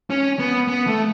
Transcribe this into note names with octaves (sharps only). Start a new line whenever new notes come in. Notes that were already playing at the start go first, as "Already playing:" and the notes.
C#4
B3
B3
A3